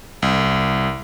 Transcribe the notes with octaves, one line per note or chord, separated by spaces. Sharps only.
C2